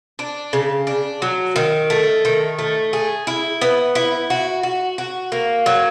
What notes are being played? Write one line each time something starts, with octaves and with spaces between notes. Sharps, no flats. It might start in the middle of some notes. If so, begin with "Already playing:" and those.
D4
C#3
D4
F#3
D#3
A3
D#3
A3
G#4
E4
B3
E4
F#4
F#4
F#4
A#3
F#3